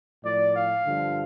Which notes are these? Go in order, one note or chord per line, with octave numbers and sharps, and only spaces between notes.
A2 F3 D5
F5
G2 D3 F3